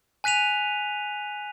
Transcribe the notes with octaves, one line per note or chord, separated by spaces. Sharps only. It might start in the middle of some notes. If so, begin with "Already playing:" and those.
G#5 F#6 B6 D#7 F7